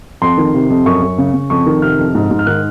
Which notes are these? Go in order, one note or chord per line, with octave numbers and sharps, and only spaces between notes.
F2 C6
D#3
C3
F2
F#2 C#6
F#2
C#3
C#3
F2 C#6
D#3
C3 F6
F2
G#2
G#2
F6
D#3 F#6